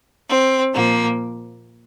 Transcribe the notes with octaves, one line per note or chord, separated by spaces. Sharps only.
C4
A#2 F3 A#3